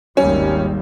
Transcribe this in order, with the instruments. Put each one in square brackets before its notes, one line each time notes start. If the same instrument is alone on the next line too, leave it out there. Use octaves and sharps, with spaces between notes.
[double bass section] G#1 D#2 G3 [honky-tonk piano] C#4